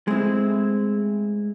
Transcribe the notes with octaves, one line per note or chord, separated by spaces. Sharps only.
G#3 A3 C4 E4